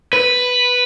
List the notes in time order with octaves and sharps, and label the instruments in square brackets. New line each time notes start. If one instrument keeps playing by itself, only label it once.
[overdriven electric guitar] B4